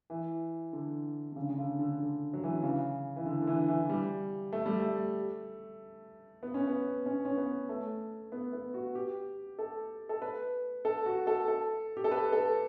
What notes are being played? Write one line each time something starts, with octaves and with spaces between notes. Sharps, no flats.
E3
D3
D3
C#3
C#3
D3
D3
D3
F#3
E3
D3
C#3
E3
D3
D3
E3
E3
G3
A3
G3
A3
B3
C#4
B3
C#4
C#4
B3
A3
B3
B3
F#4
G4
A4
A4
B4
A4
F#4
A4
A4
G4
A4
B4
A4